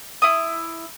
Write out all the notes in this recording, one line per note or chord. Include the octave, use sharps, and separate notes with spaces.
E4 D#6